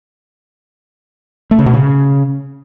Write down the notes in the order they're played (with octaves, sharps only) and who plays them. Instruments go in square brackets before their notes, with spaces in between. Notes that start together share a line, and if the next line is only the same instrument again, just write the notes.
[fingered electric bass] A3
C#3
B2
C#3